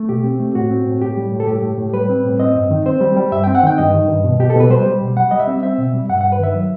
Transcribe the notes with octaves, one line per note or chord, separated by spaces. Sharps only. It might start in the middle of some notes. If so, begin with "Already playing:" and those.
Already playing: A3
B2 G4
C4
A3
A2 F#4
C4
A2
A2 G4
G3
A2
A4
A2 G4
A2
A2
G3 B4
C4
A2
C4 D#5
G2
D#3
C4 C5
G3
G3
G2 E5
C4 G5
F#5
D#3 G5
G2 D#5
D#3
G2
B2
B2 G4
A4
B2 B4
G3 C5
G3
B2
G3 F#5
G3 D#5
E5
C4
C4 E5
B2
G3
G2 F#5
G2 F#5
B4
D#3 E5
F#3